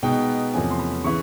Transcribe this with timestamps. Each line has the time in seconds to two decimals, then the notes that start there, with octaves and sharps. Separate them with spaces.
0.03 B2 G#3 B3 D#4 G5
0.54 E2 C3 F3 A3 C#4 G#5
0.71 C6
0.79 B5
1.04 C#3 E3 C#6